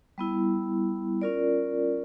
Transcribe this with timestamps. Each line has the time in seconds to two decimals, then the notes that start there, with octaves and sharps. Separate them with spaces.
0.18 G3 B3 E4
1.21 C#4 F4 A#4 D5